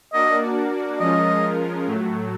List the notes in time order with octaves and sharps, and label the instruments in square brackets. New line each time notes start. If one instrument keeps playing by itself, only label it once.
[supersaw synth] A#3 D4 F#4 A#4 D5 [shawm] D#5
[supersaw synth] F3 G#3 C#4 F4 A#4 [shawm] D#5
[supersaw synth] A2 F#3 A3